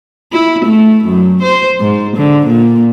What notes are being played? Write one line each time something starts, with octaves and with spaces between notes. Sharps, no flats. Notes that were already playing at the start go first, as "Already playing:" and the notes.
E4
A3
F#2
C5
G#2
D3
A#2